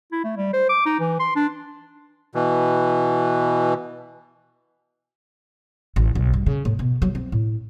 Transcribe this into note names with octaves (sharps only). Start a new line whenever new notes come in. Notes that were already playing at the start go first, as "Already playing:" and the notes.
E4
A3
G3
C5
D6
D#4
E3
C6
D4
B2 E3
A1
B1
G2
C#3
A2
B2
F#3
C4
A2